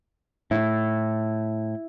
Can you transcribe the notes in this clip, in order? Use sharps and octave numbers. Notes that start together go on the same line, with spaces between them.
A2 E4